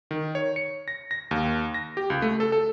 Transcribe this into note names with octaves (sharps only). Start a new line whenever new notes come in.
D#3
C#5
C#7
A#6
A#6
D#2
A#6
G4
C#2
A3
A4
A4